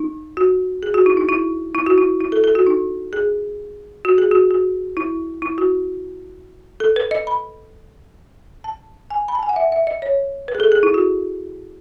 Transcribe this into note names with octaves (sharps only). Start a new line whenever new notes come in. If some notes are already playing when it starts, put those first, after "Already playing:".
Already playing: D#4
F#4
G#4
F#4
E4
D#4
E4
E4
F#4
E4
E4
A4
A4
F#4
D#4
G#4
F#4
G#4
F#4
F#4
E4
E4
F#4
A4
B4
D#5
B5
A5
G#5
B5
A5
G#5
F#5
E5
E5
D#5
C#5
B4
G#4
A4
G#4
E4
F#4